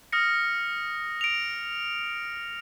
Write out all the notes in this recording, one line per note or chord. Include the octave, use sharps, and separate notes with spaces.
D#6 F6 A#6 C#7
D7 F7